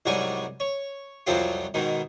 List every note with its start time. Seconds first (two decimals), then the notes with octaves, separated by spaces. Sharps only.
0.06 C2 G#2 F#3 G3 C#5 G#5
0.60 C#5
1.27 C2 F2 F3 F#3 C4 F4
1.74 G#2 B2 D#3